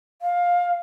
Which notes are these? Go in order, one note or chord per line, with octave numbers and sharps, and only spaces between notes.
F5